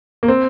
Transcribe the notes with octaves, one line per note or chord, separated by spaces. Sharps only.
A#3
C4